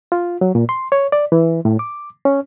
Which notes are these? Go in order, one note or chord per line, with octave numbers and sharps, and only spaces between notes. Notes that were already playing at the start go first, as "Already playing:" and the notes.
F4
F#3
A#2
C6
C#5
D5
E3
A2
D6
C#4